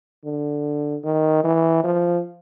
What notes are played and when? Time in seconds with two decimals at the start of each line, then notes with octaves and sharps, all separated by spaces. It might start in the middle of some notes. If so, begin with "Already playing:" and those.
0.25 D3
1.04 D#3
1.44 E3
1.84 F3